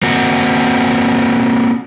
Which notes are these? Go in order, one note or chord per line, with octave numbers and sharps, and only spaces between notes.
A#3 C4 F#4